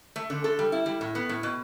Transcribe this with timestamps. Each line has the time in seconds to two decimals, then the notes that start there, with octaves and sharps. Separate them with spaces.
0.16 A3
0.30 D3
0.44 A4
0.59 G3
0.72 E4
0.86 G3
1.01 A2
1.15 B3
1.29 A2
1.43 B2